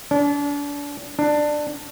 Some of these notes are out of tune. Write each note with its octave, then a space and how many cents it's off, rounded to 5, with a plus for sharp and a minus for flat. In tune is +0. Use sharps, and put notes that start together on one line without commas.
D4 -35
D4 +15